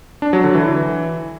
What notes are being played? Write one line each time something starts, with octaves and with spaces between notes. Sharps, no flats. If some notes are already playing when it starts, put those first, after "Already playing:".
D4
F#3
D3
E3